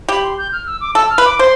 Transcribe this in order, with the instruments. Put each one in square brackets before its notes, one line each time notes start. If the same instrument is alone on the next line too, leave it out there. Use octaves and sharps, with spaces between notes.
[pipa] G4 [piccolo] B5
[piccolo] C6
G6
F6
E6
D6
[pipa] A4 [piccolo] E6
[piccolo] F6
[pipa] B4
[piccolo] D6
[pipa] C5 [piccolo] C6